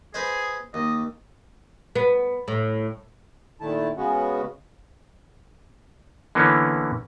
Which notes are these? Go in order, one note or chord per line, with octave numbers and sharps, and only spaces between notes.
G#4 B4 C5 D#5
D#2 D#5
B3
A2
A#2 D#3 A3 E4 A5
C#3 G#3 B3 C#4 F#4
D3 E3 A#3 B3 C#4